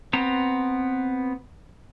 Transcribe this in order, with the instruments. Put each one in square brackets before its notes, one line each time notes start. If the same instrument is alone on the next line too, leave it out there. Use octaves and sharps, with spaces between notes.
[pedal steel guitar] B3 C4 A#5